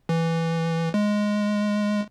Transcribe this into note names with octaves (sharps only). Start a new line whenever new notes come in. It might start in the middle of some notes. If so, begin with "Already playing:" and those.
E3
G#3